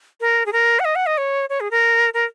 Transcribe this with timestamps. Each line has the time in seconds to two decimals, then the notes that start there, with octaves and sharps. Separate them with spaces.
0.20 A#4
0.46 G#4
0.52 A#4
0.79 F#5
0.85 D#5
0.95 F#5
1.06 D#5
1.17 C#5
1.49 C#5
1.60 G#4
1.71 A#4
2.14 A#4